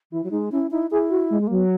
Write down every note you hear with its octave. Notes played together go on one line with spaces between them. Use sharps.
E3 E4
F#3
G#3 D#4
C#4 E4
D#4 E4
E4 G#4
F#4
G#3
G#3
A#3
F#3 B3